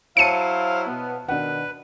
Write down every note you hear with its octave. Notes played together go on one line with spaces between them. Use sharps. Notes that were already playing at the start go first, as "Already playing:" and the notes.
F#3 E4 C5 C#5 F5 A5 C#7 D#7
B2 B3
B2 D#3 D4 B4 F#5